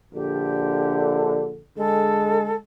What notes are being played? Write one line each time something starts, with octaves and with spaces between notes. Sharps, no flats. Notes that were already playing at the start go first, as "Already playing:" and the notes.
A#1 D3 G4
D3 G#3 A4